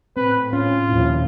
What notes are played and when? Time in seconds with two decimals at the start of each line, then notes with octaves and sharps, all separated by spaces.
0.17 A2 C4 B4
0.53 C#4 F4
0.89 D#2 A#2 F3 E4